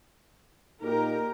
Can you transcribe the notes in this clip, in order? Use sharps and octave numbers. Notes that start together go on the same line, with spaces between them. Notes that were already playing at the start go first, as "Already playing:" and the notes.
A#2 A#3 D#4 G4 A#4